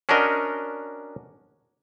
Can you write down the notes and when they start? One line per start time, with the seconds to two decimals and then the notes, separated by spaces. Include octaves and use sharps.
0.09 C#4 D4 F#4 A#4 D#5